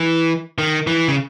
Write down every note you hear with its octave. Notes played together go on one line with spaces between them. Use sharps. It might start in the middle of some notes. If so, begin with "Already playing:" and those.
Already playing: E3
D#3
E3
C#3